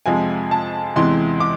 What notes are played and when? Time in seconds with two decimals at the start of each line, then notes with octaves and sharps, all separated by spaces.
0.06 F2 C3 F3 G#3 G#5
0.51 A5
0.96 E2 C3 E3 G#3 C6
1.40 D6